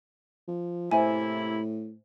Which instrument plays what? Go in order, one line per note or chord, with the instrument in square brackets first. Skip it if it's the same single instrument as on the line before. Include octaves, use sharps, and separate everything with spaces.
[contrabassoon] F3
[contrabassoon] A2 [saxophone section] C3 A#3 E4 [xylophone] C5 E5 G#5